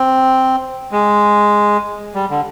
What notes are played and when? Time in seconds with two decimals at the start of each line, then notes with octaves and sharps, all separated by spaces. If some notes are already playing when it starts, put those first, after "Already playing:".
Already playing: C4
0.92 G#3
2.15 G3
2.30 D3